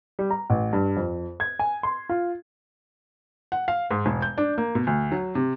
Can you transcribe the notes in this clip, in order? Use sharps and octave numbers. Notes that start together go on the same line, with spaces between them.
G3
A#5
A1
G2
F2
G#6
G#5
C6
F4
F#5
F5
G#2
E1
G6
D4
A#3
B2
D2
F#3
C3